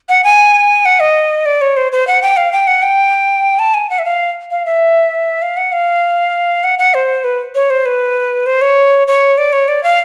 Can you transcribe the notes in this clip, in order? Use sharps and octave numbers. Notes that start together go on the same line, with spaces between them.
F#5
G#5
F#5
D#5
D5
C#5
C5
C5
F#5
G5
F5
G5
F#5
G5
A5
G#5
F#5
E5
F5
F5
E5
F5
F#5
F5
F#5
F#5
C5
B4
C#5
C5
B4
C5
C#5
C#5
D5
C#5
D5
F5